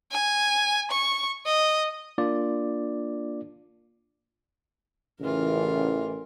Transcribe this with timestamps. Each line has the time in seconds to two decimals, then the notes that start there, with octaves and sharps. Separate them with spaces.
0.11 G#5
0.91 C#6
1.46 D#5
2.18 A#3 D4 F4 D5
5.21 A1 C#3 E3 F4 A#4